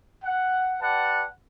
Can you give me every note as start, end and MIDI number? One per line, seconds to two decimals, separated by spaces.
0.24 0.75 78
0.82 1.25 67
0.82 1.25 71
0.82 1.25 74
0.82 1.25 78
0.82 1.25 81